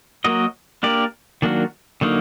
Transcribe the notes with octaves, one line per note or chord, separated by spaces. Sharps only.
F#3 A#3 F#4 A#4 D#5
A#3 D4 G4 A#4 D5
D#3 F#3 A#3 D4 F#4
D3 F#3 A#3 D#4